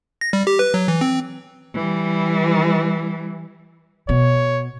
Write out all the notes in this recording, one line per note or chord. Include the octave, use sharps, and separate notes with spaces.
A#6
G3
G4
B4
F#3
E3
C4
E3 G3
B2 C#5